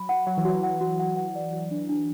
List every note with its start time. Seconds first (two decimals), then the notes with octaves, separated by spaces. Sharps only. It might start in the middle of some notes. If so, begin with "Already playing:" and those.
Already playing: F#3 B5
0.09 F#5
0.27 F#3 F#5
0.37 E3
0.45 F#3 F#4
0.63 F#5
0.81 F#4
1.00 F#5
1.17 F#5
1.35 D5
1.53 F#4
1.71 D4
1.89 D4